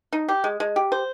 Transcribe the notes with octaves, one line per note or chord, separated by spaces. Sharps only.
D#4
G4
G#3
G#3
G4
C5